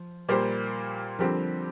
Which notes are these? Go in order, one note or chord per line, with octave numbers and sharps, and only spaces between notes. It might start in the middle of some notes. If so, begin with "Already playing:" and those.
Already playing: F3
A#2 G3 A#3 G4 C5
D3 F3 G3 C4 G4 A#4